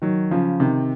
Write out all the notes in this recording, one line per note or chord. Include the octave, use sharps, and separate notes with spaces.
D#3 F#3
C#3 F3
C3 D#3